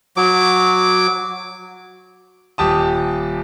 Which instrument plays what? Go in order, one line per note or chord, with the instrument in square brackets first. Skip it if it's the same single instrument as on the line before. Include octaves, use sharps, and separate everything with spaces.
[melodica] F#3 D6
[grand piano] D#1 G4 A5 D#6